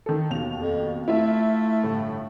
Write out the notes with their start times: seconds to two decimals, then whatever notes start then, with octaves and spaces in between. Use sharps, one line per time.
0.06 D#3 A4
0.30 D#2 B2 F7
0.57 F2
1.08 A3 E4 F4 E5
1.84 G1 A2